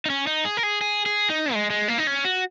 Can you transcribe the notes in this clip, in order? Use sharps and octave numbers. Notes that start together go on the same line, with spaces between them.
D#4
C#4
D#4
G#4
A#4
G#4
G#4
G#4
D#4
G#3
G#3
A#3
D#4
C#4
F#4